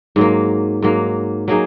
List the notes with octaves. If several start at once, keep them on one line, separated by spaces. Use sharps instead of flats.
G#2 F#3 A#3
G#2 F#3 A#3
F#3 A#3 D#4 G#4